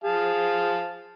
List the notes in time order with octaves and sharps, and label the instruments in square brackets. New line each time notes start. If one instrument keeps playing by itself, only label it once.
[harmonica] F3 F5 A5 [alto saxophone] G#4